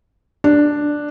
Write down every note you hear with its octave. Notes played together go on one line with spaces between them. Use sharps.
D4